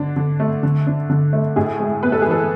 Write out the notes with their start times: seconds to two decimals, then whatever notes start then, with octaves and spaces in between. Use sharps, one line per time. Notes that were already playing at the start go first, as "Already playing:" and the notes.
Already playing: D3 D4
0.16 D3
0.40 A3
0.63 D3
0.87 D4
1.10 D3
1.33 A3
1.56 A2 G#4
1.80 G#3
2.03 B3 B4
2.12 A4
2.22 G#4
2.27 E3 A4